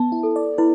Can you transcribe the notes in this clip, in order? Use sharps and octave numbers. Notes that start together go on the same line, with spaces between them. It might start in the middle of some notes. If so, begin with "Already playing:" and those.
Already playing: B3 A5
E4
A4
D5
E4 B4